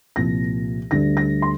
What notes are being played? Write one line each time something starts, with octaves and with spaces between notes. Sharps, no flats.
C2 A#2 F3 A#6
D2 D3 G3 A#6
A#6
C6